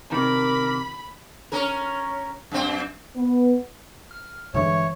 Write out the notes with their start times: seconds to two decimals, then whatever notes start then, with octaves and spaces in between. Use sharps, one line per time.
0.12 C3 D#3 A#4 B5 D6
1.52 C#4 A#4
2.52 F#2 C4
3.16 B3
4.11 F6
4.54 G2 D3 E3 G#3 C#5 E5